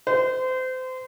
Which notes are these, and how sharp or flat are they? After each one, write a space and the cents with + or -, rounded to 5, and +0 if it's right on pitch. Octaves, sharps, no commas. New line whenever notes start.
C5 -30